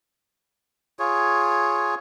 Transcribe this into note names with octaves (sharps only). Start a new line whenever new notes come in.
F4 G#4 C#5